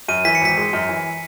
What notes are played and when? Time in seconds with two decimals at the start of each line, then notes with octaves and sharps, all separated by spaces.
0.08 F#2 D#7
0.25 E3 B6
0.35 C#7
0.41 G#1 B6
0.58 G#3
0.73 F#2
0.89 E3